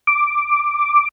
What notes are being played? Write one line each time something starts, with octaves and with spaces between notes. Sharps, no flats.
D6